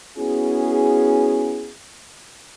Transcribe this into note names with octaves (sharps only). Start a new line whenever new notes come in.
B3 C#4 E4 F#4 G#4